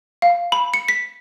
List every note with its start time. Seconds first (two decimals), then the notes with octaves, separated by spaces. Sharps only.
0.22 F5
0.52 B5
0.74 C#7
0.88 B6